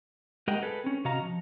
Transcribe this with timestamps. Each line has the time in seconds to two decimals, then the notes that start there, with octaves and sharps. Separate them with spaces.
0.48 G#3 G4 A#4 D#5 F#5 G5
0.63 G#4 A4 B4
0.84 C4 C#4
1.05 C3 F#4 D#5 F5 A#5
1.22 F3